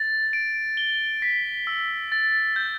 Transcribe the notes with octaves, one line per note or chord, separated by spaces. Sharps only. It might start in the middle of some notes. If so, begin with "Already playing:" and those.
Already playing: A6
D7
G7
B6
E6
A6
G6